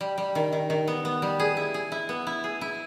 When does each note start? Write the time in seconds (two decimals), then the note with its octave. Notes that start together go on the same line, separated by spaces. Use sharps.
0.01 G3
0.18 G3
0.35 D#3
0.53 D#3
0.70 D#3
0.88 B3
1.05 B3
1.22 G3
1.40 G#4
1.57 E4
1.74 G#4
1.92 E4
2.09 B3
2.27 E4
2.44 G#4
2.61 E4